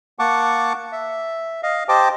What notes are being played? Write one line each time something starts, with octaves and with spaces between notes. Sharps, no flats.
A#3 F#5 A5 C#6 D6
E5
D#5 F5
G4 C5 D#5 G5 A5 D6